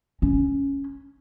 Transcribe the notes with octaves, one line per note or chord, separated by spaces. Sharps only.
C#4